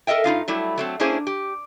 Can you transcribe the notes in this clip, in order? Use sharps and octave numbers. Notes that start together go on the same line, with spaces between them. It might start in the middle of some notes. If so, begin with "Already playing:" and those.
A4 A#4 D#5 E5 G5
G2 D#4 F4 F5
F#3 G3 A3 E4
F#3 A3 C4
A#3 C#4 D4 E4 G#4 C5
G4